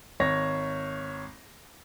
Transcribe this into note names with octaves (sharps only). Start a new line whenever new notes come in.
G#1 C#5 A#6